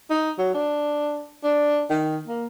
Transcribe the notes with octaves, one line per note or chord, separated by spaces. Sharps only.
D#4
F#3
D4
D4
D#3
A#3